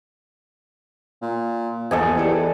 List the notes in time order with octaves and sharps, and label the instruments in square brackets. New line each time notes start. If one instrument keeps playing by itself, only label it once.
[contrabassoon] A#2
[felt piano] E2 [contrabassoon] F3 [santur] A4 D#5 G#5
[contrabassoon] E2 [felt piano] E3 G4 D5